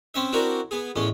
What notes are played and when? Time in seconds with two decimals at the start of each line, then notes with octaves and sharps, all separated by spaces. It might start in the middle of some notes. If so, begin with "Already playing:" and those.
0.14 C4 C#4 E5
0.32 C4 D4 E4 F#4 A#4
0.71 B3 G#4
0.96 E2 A2 G#3 C#4